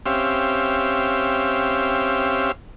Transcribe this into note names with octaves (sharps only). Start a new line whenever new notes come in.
C4 C#4 G4 E5 F5